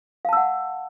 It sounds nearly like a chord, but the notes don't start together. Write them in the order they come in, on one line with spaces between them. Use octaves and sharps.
F5 A5 E6 F#5